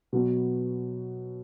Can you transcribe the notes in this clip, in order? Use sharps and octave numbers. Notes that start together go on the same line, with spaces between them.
B2 F#3 B3